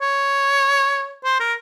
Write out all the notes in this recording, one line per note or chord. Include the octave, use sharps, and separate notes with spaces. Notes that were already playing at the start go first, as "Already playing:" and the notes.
C#5
C5
A#4